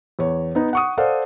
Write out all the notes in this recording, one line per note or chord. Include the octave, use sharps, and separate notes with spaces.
E2 C#5
B3 D#4
F#5 C#6 D#6
A4 C5 D5 F5 F#5